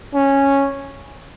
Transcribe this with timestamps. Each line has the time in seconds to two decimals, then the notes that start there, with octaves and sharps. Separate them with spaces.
0.15 C#4